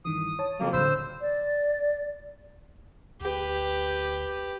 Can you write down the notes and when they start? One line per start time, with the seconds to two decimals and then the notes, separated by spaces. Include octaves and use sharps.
0.05 G2 D#3 E3 D#6
0.39 C#5 A5
0.60 F2 C#3 F3 F#3 A#3
0.73 A2 D3 C5 B5 E6 F6
1.21 D5
3.21 D2 G4 B4